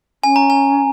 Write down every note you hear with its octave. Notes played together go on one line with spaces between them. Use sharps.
C#4 G#5
A#5
G#5